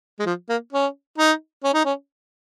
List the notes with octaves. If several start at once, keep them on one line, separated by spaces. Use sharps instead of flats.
G#3
F3
A#3
C#4
D#4
C#4
D#4
C#4